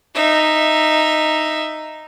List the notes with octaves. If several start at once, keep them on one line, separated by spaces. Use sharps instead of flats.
D#4 E5